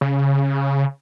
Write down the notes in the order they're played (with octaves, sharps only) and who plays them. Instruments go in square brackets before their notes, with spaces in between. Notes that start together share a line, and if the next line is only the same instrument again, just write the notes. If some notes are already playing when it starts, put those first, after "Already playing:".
[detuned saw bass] C#3